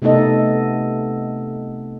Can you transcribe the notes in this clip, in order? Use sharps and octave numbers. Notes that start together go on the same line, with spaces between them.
C3 A3 B3 D#4 A4 D#5